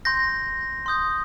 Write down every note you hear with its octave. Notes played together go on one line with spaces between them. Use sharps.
C6 G6 A#6
C6 D#6 G6